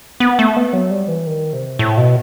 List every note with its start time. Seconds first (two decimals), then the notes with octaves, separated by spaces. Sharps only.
0.20 B3
0.39 A3
0.56 B3
0.73 F#3
0.91 G3
1.08 E3
1.27 D#3
1.53 C3
1.79 A2
1.97 B2